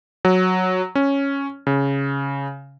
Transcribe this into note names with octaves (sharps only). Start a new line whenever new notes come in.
F#3
C#4
C#3